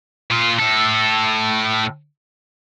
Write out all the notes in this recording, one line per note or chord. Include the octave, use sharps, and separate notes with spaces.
A#2 F4
A2 A4